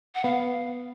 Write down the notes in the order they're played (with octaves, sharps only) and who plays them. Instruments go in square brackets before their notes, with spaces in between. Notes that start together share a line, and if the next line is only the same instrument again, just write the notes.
[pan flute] F#5
[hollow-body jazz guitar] B3 [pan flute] F5